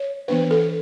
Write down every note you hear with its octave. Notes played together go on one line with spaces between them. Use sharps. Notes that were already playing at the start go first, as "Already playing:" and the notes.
Already playing: C#5
E3 B3 D4 B4
A4